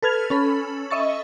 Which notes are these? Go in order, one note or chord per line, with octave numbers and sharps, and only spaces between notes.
A4 B4 F6 G#6 F7
C#4 A4 B5
D#5 E5 C#6 A6